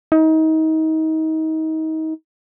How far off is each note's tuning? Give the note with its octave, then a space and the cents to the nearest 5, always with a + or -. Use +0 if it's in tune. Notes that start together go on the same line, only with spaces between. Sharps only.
D#4 +30